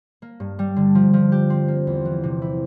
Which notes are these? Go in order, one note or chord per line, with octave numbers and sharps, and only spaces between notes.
A#3
G2
G3
D3
F3
F3
G4
C4
A#3
E2
E3
C3
E4